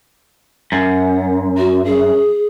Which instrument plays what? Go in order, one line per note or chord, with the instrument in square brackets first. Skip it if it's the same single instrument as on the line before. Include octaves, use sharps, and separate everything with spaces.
[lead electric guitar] F#2 [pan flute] F#5
[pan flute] F#4
G#4